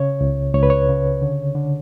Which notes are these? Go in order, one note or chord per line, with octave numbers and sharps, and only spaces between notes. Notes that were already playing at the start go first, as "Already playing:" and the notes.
Already playing: C#3 C#5
C#2
C#2 C#5
B4
C#5
C#3
D3
D3